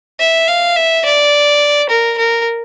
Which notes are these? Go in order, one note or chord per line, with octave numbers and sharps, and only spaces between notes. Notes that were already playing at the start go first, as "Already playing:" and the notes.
E5
F5
E5
D5
A#4
A#4